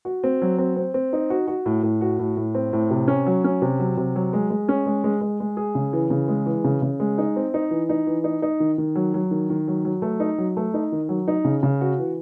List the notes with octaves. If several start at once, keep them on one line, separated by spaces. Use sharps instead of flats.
F#4
C4
F#3
C4
C4
C4
D#4
F#4
F#4
A2
A2
F#4
A2
A2
C4
A2
C3
C#4
F#3
C#4
C3
F#3
C3
F#3
G#3
G#3
C#4
G#3
G#3
G#3
G#3
G#4
C#3
E3
C#3
G#3
E3
C#3
C#3
G#3
D#4
C4
D#4
E3
D#4
E3
D#4
D#4
D#3
D#3
F#3
F#3
D#3
D#3
F#3
F#3
A3
D#4
F#3
A3
D#4
D#3
F#3
D#4
C#3
C#3
F#4
E3